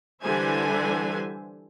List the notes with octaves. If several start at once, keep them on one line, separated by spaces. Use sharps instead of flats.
D3 E3 G3 C5 E5 G#5